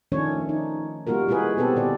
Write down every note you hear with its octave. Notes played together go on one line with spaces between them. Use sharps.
D#3 F3 A3 C#4 D4 C#5
D#4
G3 A#3 F4 F#4 A#4
G#3 E4 F#4 G#4 B4
B2 B3 C4 G4 A4
A#2 D3 G4 D5